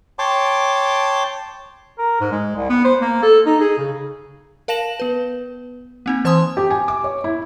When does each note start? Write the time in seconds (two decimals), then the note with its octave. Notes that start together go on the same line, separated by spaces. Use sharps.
0.19 C#5 G5 A5 C6 D6
1.98 A#4
2.20 G#2
2.32 G#3
2.56 C2
2.70 B3
2.85 C5
3.01 A#3
3.23 A4
3.46 D#4
3.61 G#4
3.78 C#3
4.68 A#4 F5 A5 A#6 E7 F#7
5.00 B3 B4
6.06 A#3 C4 D#4
6.25 E3 C5 G#5 A5 C6 D#6
6.57 G4
6.70 G#5
6.88 D6
7.04 C#5
7.24 E4